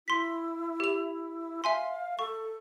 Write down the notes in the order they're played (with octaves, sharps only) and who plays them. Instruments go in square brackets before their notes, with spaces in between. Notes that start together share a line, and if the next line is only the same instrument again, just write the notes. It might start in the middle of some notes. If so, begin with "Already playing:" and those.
[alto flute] E4 [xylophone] C6 B6
[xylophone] G4 F7
[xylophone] E5 G#5 C6 [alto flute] F5
[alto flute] A4 [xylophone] C#6